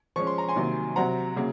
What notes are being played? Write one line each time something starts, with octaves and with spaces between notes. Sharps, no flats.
F3 G#3 C#4 C#6
C6
A#5
G#5 C6
C3 D#3 F#3 A#3
C3 F#3 C4 F#5 A#5
C#3 F#3 A#3